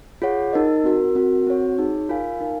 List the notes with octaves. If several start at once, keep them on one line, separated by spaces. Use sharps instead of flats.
F4 G#4 C#5 F#5
D#4 A#4 D#5
C4 F#4 A#4
C4 F#4 A#4
C4 F#4 C#5 F#5
D#4 G#4 C#5
F4 A#4 F5 G#5
D#4 A#4 F5 G#5